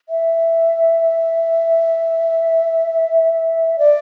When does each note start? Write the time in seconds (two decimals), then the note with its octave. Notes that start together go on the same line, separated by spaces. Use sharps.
0.09 E5
3.79 D5